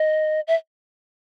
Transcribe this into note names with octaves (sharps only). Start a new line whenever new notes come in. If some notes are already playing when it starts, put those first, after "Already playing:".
Already playing: D#5
E5